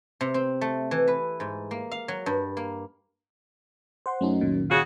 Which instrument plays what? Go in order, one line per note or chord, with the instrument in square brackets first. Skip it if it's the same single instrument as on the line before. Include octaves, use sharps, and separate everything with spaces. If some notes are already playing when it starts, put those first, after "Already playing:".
[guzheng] C3
C4
A3
E3
B4
G#2
A#3
F5
F#3
G2
A#3
[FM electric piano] C5 F#5 C6
[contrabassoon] F#2 [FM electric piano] A3 C#4 D#4
[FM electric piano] C#2 A#2 D#3
[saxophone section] C#3 F4 F#4